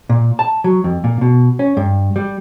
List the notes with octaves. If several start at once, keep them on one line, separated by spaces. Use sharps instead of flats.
A#2
A5
F#3
F2
A#2
B2
C#4
G2
G3